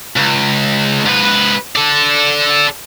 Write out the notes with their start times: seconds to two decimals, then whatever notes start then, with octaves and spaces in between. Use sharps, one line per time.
0.17 C#2
1.06 G#2 B4
1.76 A4 D5